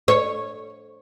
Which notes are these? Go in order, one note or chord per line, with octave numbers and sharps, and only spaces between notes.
C#5